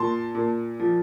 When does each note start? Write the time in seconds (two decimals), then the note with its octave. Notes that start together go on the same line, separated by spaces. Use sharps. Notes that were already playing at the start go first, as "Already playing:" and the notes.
Already playing: A#2 A5 C6
0.35 A#2
0.80 F3